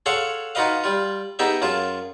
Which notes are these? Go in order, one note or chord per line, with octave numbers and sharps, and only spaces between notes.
G#4 A4 C#5 F5 F#5 C6
D#4 F4 F#4 B4 D#5 F5
G3 F4
B3 D#4 G4 G#4 D#5 E5
F#2 F4 G#4 A5